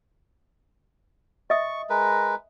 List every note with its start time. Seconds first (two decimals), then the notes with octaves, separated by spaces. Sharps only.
1.50 D#5 E5 C#6 D#6
1.90 G#3 A#4 B4